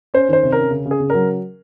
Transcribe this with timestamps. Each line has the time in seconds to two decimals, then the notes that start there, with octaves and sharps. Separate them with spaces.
0.14 C#4 C5
0.29 D#3 C5
0.43 C3
0.52 C#4 A#4
0.71 C#3
0.86 C#3
0.91 G#4
1.00 C#3
1.10 A#4
1.15 F#3